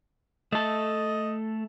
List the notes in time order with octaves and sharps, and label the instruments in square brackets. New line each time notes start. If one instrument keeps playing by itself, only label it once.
[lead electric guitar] A3 A4 [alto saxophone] D#5